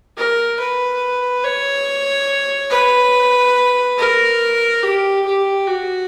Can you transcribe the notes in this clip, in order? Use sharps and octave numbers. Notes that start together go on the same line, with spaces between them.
A#4
B4
C#5
B4
A#4
G4
G4
F#4